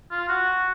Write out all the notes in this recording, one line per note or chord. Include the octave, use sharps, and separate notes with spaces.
F4
F#4